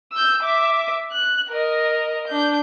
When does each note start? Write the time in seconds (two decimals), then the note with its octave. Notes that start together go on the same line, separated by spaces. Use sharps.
0.13 E6 G6
0.43 E5 D6
1.12 F#6
1.50 A#4 D#5
2.27 D4 G6